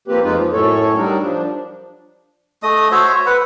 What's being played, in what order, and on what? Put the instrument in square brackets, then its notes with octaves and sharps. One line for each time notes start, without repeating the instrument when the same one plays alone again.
[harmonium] F3 A#3 C4 G4 B4
F2 G#3 A#3 D#4 F4 B4
F3
F#2 A2 A4 C#5
F#3 G3 D4 D#4 A#4
F3 D4
[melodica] A3 D#5 D#6
F#4 C5 C#5 E5
B4 F#5